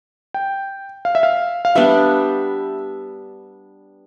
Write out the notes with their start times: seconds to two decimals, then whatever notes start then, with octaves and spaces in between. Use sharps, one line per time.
0.34 G5
1.05 F5
1.15 E5
1.23 F5
1.65 F5
1.75 G3 B3 D4 G4 E5